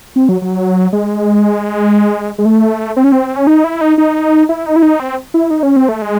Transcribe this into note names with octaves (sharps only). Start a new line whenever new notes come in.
C4
F#3
F#3
G#3
G#3
A3
C4
C#4
C4
C#4
D#4
E4
D#4
D#4
E4
D#4
E4
D#4
C4
E4
D#4
C#4
C4
A3
G#3